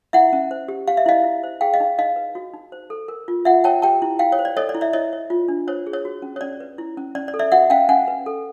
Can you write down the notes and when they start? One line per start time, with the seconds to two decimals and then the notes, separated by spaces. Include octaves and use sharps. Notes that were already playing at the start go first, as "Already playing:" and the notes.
0.13 E4 E5 F#5
0.33 C#4
0.51 C5
0.68 G4
0.87 G4 F5
0.97 E5
1.06 E4 D#5 F5
1.24 E4
1.43 C5
1.61 G#4 F5 G5
1.74 D#5 F5
1.80 D#4
1.98 D#4 D#5 F5
2.16 B4
2.35 F#4
2.54 D#4
2.72 C5
2.90 A4
3.08 A#4
3.28 F4
3.45 F4 E5 F#5
3.64 C#5 G5 A5
3.82 G4 G5 A5
4.02 E4
4.19 E4 F5 G5
4.32 C#5
4.39 C5
4.45 D5
4.57 A4 C#5 D#5
4.69 D5
4.75 E4
4.81 D5 E5
4.93 E4 C#5 D#5
5.13 C#5
5.30 F4
5.48 D4
5.68 C5 C#5
5.87 G#4
5.93 C#5
6.05 F#4
6.22 C#4
6.36 C#5
6.41 C#4 D5
6.60 B4
6.78 E4
6.97 C#4
7.15 C#4 D5
7.28 D5
7.34 A4
7.39 D5 E5
7.52 F#4 E5 F#5
7.70 C#4 F5 G5
7.89 C#4 F#5 G#5
8.08 B4
8.26 A4